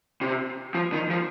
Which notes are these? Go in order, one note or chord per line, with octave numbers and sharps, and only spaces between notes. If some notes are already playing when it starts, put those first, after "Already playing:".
C3
F3
D#3
F3